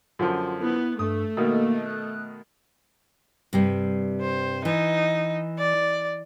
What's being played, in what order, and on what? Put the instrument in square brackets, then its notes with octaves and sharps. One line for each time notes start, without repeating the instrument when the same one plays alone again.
[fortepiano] F#2 D3 F3 [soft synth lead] F4
[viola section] B3 [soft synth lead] E4
[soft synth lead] G2 [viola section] A3 [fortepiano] D#6
[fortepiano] B2 D#3 [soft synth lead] A#3
[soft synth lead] F#6
[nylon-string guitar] G2 C3 G3
[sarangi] C5
[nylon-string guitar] E3 [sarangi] D#4
[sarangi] D5